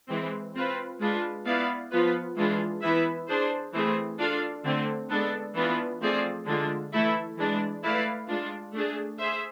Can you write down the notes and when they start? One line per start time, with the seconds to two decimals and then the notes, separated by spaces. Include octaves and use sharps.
0.09 E3 G#3 C4
0.55 C4 F4 B4
1.00 G#3 D4 F4 B4
1.45 B3 E4 B4 D5 F5
1.92 F3 B3 F4 B4
2.36 E3 G#3 D4 F4 G#4
2.81 E3 B3 E4 B4 E5
3.28 D4 G#4 C5
3.73 E3 A3 C4 G#4
4.18 D4 F4 A4 D5 F5
4.64 D3 A3 C4
5.10 G#3 B3 D4 A4
5.54 E3 B3 D4 F4 B4
6.01 F3 A3 C4 G#4 D5
6.46 D3 G#3 D4 F4
6.92 E3 A3 E4 A4 E5
7.38 E3 G#3 D4
7.82 A3 E4 B4 D5 F5
8.28 G#3 D4 F4
8.73 A3 D4 G#4
9.19 G#4 C5 E5